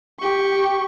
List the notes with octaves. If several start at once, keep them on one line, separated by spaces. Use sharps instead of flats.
G4 C#6